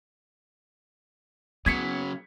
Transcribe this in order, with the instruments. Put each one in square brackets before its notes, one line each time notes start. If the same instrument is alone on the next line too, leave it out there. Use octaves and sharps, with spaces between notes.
[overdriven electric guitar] C#3 F#3 [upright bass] B3 [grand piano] G#6 B6 C#7